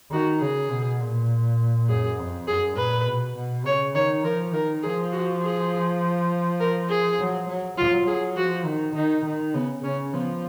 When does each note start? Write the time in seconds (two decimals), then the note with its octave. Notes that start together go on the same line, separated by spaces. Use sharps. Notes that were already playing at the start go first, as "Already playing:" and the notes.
0.12 D#3 F#4
0.41 C#3 G#4
0.71 B2
1.00 A#2
1.89 F#2 G#4
2.18 F2
2.47 F#2 G#4
2.77 A#2 B4
3.06 B2
3.36 B2
3.65 C#3 C#5
3.95 D#3 C#5
4.24 F3 A#4
4.53 D#3 A#4
4.83 F3 G#4
5.12 F#4
5.42 G#4
6.60 A#4
6.89 G#4
7.19 F#3
7.47 F#3
7.77 F#3 F4
8.07 F#3 G#4
8.36 F3 F#4
8.65 D#3
8.95 D#3 D#4
9.25 D#3
9.54 C#3 B3
9.84 C#3 C#4
10.13 F3 B3